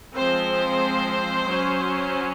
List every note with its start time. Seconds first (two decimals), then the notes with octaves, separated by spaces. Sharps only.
0.15 F3 G#3 C4 C5
1.45 F#3 C#4